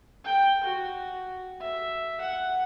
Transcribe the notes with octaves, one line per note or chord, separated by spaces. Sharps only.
G5
F#4
E5
F#5